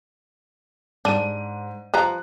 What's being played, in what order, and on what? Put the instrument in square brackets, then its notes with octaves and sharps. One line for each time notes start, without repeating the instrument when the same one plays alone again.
[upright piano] G#2 D#7 [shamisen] D4
[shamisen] F3 B4 A#5 [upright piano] F#6